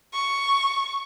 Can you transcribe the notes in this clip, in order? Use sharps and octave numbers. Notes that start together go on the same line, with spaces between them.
C#6